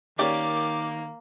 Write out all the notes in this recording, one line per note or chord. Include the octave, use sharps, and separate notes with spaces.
D#3 A#3 C#4 G4 D5 D6